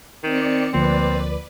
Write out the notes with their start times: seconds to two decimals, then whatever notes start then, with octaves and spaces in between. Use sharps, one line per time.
0.24 D#3 C4 D5 C#7
0.74 D2 F3 A#3 C4 B4 D5